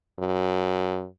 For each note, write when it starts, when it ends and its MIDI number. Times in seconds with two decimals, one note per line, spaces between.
0.19 1.06 42